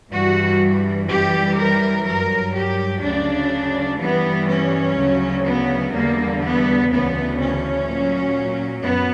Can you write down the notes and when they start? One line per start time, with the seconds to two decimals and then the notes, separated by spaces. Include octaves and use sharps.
0.12 G2 E3 G3 F#4
1.09 F#2 E3 G3 G4
1.58 A#4
2.05 G2 F#3 A#4
2.54 G4
3.03 D2 C#3 F#3 D4
4.00 G2 E3 G3 B3
4.48 C#4
4.97 D2 C#3 F#3
5.45 B3
5.93 E2 D3 G3 A#3
6.41 B3
6.90 D2 C#3 E3 B3
7.39 C#4
7.87 A#2 F#3
8.83 F#2 B3